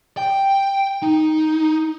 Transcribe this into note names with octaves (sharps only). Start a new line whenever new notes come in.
G5
D#4